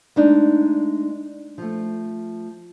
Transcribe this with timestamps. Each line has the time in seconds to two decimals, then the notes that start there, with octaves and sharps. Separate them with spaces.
0.16 G#3 A3 D4 D#4
1.58 F3 A3